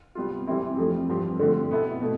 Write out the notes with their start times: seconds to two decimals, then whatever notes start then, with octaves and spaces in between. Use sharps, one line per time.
0.15 C3 G3 B3 F4
0.47 C3 E3 G3 C4 E4
0.77 F2 C3 F3 A3
1.09 G2 F3 C4 G4
1.39 D3 F3 A3 C4
1.71 B2 B3 E4 A4
2.01 B2 A3